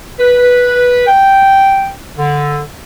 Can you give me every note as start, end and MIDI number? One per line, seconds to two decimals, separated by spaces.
0.19 1.05 71
1.07 1.92 79
2.17 2.60 50